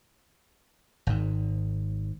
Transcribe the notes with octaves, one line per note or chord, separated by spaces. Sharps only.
G#1 G#2